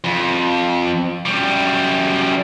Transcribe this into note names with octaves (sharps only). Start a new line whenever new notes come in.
F2
F#2 G3